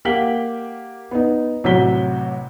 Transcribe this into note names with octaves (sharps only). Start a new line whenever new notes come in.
A#3 G4 F#5 B6 F#7 G7
B3 D#4
A1 C3 F#3 F#4 B6 G7